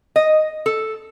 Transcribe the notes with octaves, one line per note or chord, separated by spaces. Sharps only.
D#5
A4